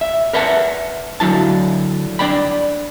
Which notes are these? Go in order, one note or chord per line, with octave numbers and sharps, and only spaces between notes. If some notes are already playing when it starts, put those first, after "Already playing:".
E5
A#4 B4 E5 F#5 A5
D3 F#3 E4 A5
D4 D5 G5 B5